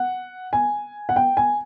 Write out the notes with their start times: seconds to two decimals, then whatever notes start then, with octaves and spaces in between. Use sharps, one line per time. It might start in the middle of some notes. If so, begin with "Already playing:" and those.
Already playing: F#5
0.53 G#5
1.09 F#5
1.16 G5
1.37 G#5